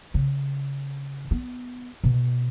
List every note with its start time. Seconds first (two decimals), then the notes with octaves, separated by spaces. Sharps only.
0.14 C#3
1.31 B3
2.04 B2